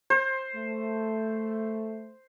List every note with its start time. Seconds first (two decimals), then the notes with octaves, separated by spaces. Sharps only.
0.10 C5
0.54 A3